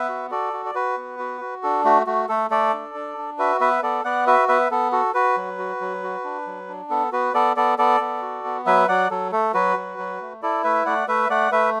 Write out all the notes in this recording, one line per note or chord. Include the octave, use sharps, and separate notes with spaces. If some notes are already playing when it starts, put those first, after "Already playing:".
Already playing: B3 B4 E5
F#4
F#4 A4 D5
F#4
D5
F#4 B4
B3
F#4
F#4
D4 A4
A3 F#4
A3 F#4
A3 A4
A3 A4 D5
D4
D4
D4
F#4 B4 E5
B3 B4 E5
B3 A4 D5
B3 D5 F#5
F#4 B4 E5
B3 B4 E5
B3 A4
F#4 A4
F#4 B4
F#3
F#4
F#3
F#4
D4
F#3
D4
B3 A4
B3 F#4 B4
B3 A4 D5
B3 A4 D5
B3 A4 D5
B3
F#4
B3
F#3 B4 E5
F#3 D5 F#5
F#3 A4
A3 A4
F#3 F#4 B4
F#3
F#3
A3
E4 A4 D5
A3 B4 E5
A3 D5 F#5
A3 B4 E5
A3 D5 F#5
A3 B4 E5